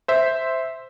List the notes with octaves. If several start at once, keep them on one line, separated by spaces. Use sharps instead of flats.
C5 E5